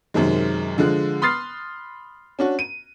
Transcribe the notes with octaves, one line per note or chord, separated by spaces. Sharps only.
F#2 C3 D#3 G#3
D3 F3 G#3 F#6
B5 C6 D#6 F6 A6 C7
C#4 D4 F#4
D#7